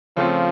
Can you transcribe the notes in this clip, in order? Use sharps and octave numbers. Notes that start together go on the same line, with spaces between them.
C#3 F3 A3 C4 F4